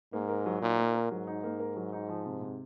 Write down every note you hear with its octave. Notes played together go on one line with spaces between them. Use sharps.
G#2 A#3
A#4
F#3
A#2 D#4
A#3
A#4
G#2 F#3
D#4
A#3
A#4
F#3
D#4
F3
C3
C3